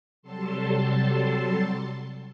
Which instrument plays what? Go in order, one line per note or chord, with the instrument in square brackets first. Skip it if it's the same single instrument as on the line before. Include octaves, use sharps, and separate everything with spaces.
[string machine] C3 F#3 G3 A4 A5 C6